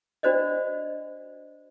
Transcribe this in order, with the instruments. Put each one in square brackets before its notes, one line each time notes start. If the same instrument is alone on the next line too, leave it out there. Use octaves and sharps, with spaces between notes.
[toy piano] D4 F#4 C5 D5 D#5